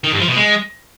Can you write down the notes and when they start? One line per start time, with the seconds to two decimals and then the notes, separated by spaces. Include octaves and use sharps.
0.04 D#3
0.12 G2
0.20 F3
0.28 B2
0.36 G#3